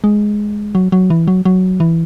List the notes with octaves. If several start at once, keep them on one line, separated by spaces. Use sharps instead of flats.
G#3
F#3
F#3
E3
F#3
F#3
E3